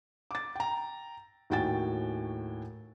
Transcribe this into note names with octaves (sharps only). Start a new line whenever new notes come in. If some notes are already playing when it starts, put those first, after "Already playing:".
D6 A6
G5 A#5
D#2 A2 F#4 G5 G#5 A6